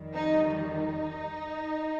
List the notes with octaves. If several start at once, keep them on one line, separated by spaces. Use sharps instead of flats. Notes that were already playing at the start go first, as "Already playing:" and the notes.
Already playing: F2 D#3 G3
D#4
D#4